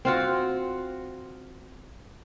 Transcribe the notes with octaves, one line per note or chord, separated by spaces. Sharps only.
C4 F4 F#4